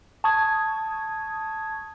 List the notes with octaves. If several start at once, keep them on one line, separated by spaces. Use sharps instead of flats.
A5 C#6 D#6 G#6